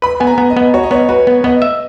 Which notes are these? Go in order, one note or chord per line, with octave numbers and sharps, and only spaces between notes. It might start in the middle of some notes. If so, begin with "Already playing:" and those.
B4 B5
B3 G#5
A#5
B3
D#5
B3
F#4 C#5
D#5
B3 C#5
F#4 B4
B3
B3 D#5
E5